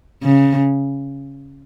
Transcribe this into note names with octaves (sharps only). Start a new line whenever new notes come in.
C#3